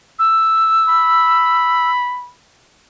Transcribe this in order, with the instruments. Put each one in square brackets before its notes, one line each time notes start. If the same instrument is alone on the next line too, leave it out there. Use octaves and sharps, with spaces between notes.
[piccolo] E6
[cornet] B5